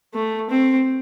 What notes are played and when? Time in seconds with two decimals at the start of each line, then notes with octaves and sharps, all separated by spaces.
0.14 A3
0.51 C4